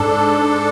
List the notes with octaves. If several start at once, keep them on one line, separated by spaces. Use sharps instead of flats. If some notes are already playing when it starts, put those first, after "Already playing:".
Already playing: G#2 D4 A4
G#2